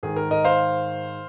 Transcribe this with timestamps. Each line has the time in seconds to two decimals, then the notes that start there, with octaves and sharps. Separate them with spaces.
0.03 G#2 D#3 G#4
0.16 A#4
0.31 A#4 D#5
0.45 C5 F5